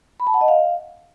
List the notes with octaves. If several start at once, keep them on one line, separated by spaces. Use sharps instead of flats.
B5
A5
F#5
D#5
F5